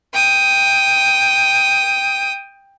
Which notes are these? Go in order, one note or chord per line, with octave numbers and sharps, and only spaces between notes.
G5 D#6